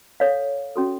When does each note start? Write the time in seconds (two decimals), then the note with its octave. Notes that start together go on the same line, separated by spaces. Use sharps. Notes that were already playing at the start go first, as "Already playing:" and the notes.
0.20 A4 C#5 F5
0.76 C#4 F#4 A4